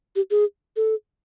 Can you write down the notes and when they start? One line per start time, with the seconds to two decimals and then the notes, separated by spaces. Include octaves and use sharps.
0.16 G4
0.31 G#4
0.76 A4